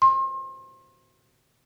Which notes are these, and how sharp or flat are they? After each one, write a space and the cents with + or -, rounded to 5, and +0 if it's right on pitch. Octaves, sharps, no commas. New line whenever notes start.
C6 +35